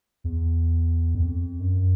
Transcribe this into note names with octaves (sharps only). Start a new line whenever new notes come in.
E2
F2
F#2